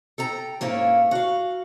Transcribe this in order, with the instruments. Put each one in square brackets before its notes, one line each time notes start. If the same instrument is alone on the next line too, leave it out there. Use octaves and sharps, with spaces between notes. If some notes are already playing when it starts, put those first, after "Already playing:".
[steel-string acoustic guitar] A4 G5 A#5
G#2 A#3 C#4 E4 F4
F#4 F5